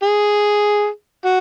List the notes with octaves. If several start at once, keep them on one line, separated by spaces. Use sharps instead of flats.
G#4
F#4